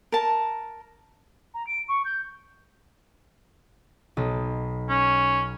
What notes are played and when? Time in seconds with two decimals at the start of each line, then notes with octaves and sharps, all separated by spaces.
0.12 A#4 A5
1.54 A#5
1.67 D7
1.88 C#6
2.05 G6
4.17 B1 D#5 A5
4.89 C#4